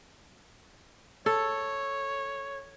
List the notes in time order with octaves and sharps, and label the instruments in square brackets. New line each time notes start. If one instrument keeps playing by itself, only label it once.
[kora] A4 [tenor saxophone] C#5